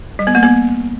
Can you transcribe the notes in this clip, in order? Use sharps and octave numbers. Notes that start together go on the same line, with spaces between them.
G3
B3
A#3
B3